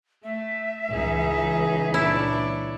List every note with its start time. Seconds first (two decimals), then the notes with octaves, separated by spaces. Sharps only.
0.24 A3 E5
0.91 C#2 E3 D#4 G#4
1.94 A#2 D4 E4 C#5